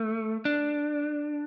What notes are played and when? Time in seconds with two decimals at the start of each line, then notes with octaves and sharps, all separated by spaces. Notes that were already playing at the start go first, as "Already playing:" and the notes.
Already playing: A3
0.45 D4